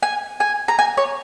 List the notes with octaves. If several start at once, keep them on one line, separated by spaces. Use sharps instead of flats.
G#5
G#5
A#5
G#5
C#5